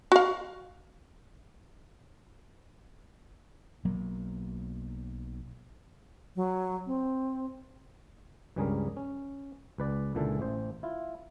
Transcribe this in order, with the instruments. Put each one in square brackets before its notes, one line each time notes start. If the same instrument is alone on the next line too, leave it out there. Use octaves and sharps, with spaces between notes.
[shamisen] F#4 F5
[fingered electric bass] B1 F#3 A#3
[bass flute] F#3
C4
[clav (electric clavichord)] C#2 G2 G3 C#4 G#4 A#4
C#4
C#2 B4 D5
C#2 A#2 D3 E3 A4
A1 C5
E4 F4